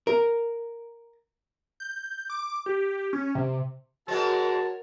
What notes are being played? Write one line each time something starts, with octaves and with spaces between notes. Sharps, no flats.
A#4
G6
D6
G4
C#4
C3
B2 G#3 C4 F#4 A#4 C#5 A5